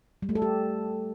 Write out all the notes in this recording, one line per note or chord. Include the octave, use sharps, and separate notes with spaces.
G3
A3
A4
G4